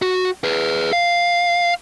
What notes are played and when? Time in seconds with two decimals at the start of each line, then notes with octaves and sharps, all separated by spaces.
0.02 F#4
0.44 G#4 B4
0.93 F5